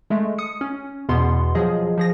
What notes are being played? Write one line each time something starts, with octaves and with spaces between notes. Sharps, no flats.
G#3 A3 E5
D#6 C#7
C#4
E2 B2 B3 C6
F3 F#3 G#4 D#5
F3 G#4 A#6